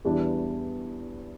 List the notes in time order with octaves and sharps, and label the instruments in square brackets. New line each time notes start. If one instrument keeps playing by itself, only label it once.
[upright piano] E2 E3 G3 D4